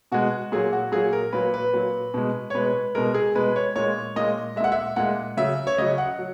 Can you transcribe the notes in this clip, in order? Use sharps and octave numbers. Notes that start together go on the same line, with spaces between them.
B2 G#3 F#4
A#2 F#3 G#4
F#4
A#2 F#3 G#4
A#4
A#2 F#3 B4
B4
A#2 F#3
B2 G#3
C#5
B2 G#3 B4
B2 G#3 A#4
G#4
B2 G#3 B4
C#5
A#2 G#3 C#5
A#2 G#3 D#5
A#2 G#3 E5 F#5
E5
A#2 G#3 F#5
C#3 F#3 E5
C#5
C#3 F#3 D#5
F#5
F#3